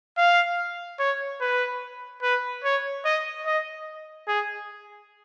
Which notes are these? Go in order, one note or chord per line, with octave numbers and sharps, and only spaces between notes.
F5
C#5
B4
B4
C#5
D#5
D#5
G#4